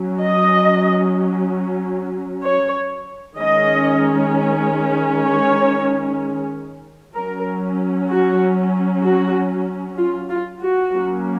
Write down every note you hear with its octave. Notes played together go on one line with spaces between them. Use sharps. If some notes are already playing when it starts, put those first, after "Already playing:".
Already playing: F#3 C#4
D#5
C#5
D#3 G#3 C#4 D#5
C#5
F#3 C#4 A#4
F#4
F#4
F4
F4
F#4
F#3 A#3 C#4